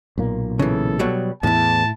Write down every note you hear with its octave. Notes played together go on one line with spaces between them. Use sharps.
B1 A#2 A#3
C#3 E3 A4
B2 F#3 G3
E2 A2 E4 A5